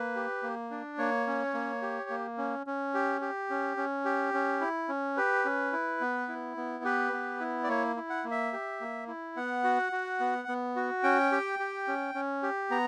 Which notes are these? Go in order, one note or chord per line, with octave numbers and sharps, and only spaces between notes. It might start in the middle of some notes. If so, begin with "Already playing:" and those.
Already playing: A#3 B4
G4
A#3
D4
A#3 C#5
C#4
A#3
G4
A#3
C#4
C#4
G4
G4
C#4
C#4
G4
C#4
E4
C#4
G4 B4
C#4
E4
B3
E4
B3
G4 B4
B3
E4
D5
A#3 C#5
E4
F#5
A#3
E5
G4
A#3
E4
B3 F#5
F#4
F#4
B3
B3
F#4
C#4 G5
G4
G4
C#4
C#4
G4
B3 A#5